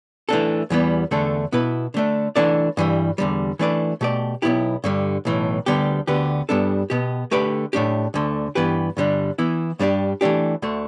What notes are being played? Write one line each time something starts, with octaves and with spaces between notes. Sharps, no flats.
E3 A3 D4 A4
E2 E3 G3 B3
E2 D3 A3 D4 A4
B2 B3 E4 B4
D3 A3 D4
E3 A3 D4 A4 D5
G2 E3 G3
E2 D3 G3
E3 A3 D4 B4 D5
B2 A3 G4 D5
B1 B2 B3 E4 G4
G2 D3 G3
B1 A2 E3
D2 D3 G3 B3 G4
D2 D3 B3 G4 B4
G2 G3 B3 D4 A4
B2 B3 G4
D3 A3 G4 B4 D5
A2 A3 D4 G4
D2 D3 A3
G2 E3 B3 G4 B4
G2 D3 G3 D4
E3 B3 E4
G2 G3 D4 G4
E3 A3 D4 G4
D2 D3 A3